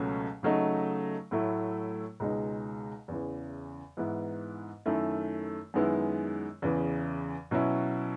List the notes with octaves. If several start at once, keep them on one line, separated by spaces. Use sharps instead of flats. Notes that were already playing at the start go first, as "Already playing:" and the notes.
Already playing: C#2 B2 F#3 A3 C#4
C#3 F#3 A3 D#4
A2 F#3 A3 E4
C#2 B2 G#3 D#4
E2 C#3 E3
G#2 E3 B3 E4
F#2 D#3 A3 E4
F#2 D#3 G#3 B3 E4
E2 C#3 E3
B2 F#3 C#4 E4